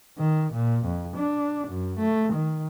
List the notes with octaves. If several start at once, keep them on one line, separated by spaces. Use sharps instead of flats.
D#3
A#2
F2
D4
F#2
A3
D#3